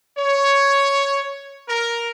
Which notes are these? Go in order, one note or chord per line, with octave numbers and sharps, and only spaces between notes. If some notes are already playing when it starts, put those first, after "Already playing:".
C#5
A#4